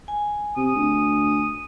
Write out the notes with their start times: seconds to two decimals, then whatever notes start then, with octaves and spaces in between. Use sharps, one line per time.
0.08 G#5
0.57 C3 D#6
0.75 D2